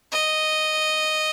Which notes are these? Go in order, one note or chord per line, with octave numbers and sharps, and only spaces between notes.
D#5